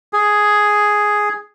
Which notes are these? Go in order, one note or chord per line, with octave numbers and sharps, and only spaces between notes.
G#4